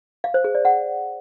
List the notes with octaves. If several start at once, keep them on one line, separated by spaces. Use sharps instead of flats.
F5
C5
G#4
D5
F#5